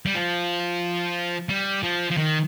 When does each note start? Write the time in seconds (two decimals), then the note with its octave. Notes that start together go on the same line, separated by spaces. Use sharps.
0.06 G3
0.15 F3
1.49 G3
1.83 F3
2.11 F3
2.17 D#3